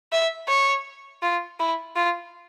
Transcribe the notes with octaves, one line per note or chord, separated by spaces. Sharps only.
E5
C#5
F4
E4
F4